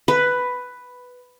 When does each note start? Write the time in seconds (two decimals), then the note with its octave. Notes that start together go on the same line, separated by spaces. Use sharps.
0.08 B4